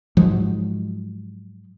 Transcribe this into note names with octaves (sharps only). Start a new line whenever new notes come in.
G#2 F3 F#3 G#3